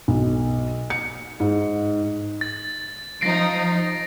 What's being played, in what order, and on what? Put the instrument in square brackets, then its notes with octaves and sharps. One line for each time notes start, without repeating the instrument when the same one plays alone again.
[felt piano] B1
C#7
G#2
[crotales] A6
[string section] F3 D#4 [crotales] A#6 C7 D7